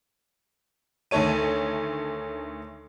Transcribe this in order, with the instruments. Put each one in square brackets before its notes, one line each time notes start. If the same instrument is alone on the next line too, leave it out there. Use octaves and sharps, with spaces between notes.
[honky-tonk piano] D2 D#3 A3 A4 C#5 D#7